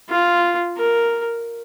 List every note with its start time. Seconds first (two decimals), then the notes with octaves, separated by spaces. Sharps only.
0.09 F4
0.76 A#4